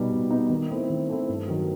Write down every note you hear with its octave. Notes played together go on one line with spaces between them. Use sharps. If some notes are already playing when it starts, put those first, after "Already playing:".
Already playing: B2 G3 B3 D#4
B2
G3 B3 D#4
D#3
A3 C4 E4
D#3
A3 C4 E4
G2
D#3 F#3